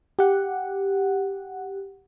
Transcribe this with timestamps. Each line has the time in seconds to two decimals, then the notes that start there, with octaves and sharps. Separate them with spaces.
0.19 G4 F#5